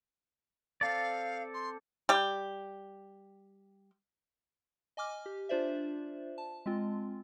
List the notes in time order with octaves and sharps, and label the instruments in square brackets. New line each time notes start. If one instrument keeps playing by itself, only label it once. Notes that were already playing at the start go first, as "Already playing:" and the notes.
[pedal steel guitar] C4 A4 D5 [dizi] F5
[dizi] C6
[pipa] G3 G4
[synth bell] D#5 G#5 D6 F6
G4
D4 F4 C5 D5 E5
A5
G#3 C4 F4